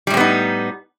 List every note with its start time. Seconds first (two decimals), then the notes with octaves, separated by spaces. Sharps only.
0.07 G3
0.10 A2
0.14 C4
0.17 B3
0.20 D#4